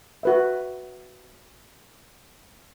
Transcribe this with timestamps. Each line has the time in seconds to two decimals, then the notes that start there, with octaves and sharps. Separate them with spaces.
0.23 F#4 B4 E5